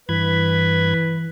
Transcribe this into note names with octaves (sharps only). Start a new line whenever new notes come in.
G2 E3 B4 B5 G#6